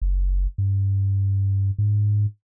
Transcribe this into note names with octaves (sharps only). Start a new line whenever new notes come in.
F#1
G2
G#2